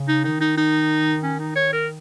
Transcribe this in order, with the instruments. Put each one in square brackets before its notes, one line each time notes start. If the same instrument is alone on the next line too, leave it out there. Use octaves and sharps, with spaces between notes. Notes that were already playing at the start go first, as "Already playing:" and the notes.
Already playing: [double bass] C#3
[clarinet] D#4
[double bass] D#3 [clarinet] D#4
[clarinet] D#4
D#4
C#4
D#4
C#5
A#4